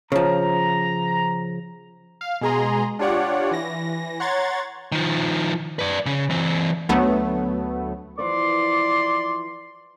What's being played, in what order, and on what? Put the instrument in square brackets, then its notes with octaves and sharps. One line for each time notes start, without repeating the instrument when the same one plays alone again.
[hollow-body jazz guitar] C#3 F3 [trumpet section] A#5
[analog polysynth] F5
B2 G#3 G#4 A#5 C6
D4 F4 G4 C#5 D5 F#5
E3 A#6
C#5 F#5 A#5 C6 G#6 A6
[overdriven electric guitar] D#3 F3
B4 D5
C#3
E3 C4
[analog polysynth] D2 F#3 A3 B3
[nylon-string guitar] E3 F3 B3 [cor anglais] D5 [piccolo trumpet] C6